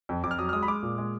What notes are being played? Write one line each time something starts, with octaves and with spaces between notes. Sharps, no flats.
F2
F2 D6
F6
F#3 D#6
F6
G#3 D#6
B5
G#3 D6
A#2
G#3